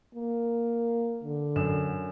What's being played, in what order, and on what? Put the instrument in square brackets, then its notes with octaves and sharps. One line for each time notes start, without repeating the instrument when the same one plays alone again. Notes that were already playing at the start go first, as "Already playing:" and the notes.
[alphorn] A#3
D3
[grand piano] F#2 E7